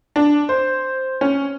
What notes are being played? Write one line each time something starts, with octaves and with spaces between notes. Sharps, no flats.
D4
C5
C#4